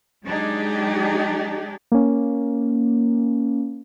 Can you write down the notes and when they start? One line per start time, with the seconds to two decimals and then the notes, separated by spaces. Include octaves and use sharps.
0.24 F#3 G#3 D4 D#4 G4 G#4
1.92 A#3 C#4